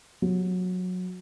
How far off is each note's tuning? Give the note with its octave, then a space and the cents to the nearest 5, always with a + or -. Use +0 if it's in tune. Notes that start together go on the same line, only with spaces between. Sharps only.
F#3 -20